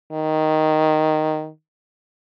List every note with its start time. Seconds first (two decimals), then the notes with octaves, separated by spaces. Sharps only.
0.13 D#3